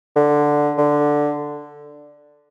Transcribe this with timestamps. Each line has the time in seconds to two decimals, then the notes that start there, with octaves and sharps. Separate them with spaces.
0.16 D3
0.78 D3